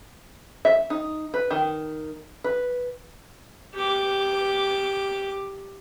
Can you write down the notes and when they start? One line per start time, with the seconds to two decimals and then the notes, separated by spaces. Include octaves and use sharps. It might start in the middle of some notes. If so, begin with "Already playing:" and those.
0.65 E5
0.90 D#4
1.34 B4
1.51 D#3
2.44 B4
3.75 G4 D6